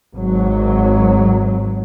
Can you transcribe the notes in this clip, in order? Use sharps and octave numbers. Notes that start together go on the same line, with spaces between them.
G#1 F#3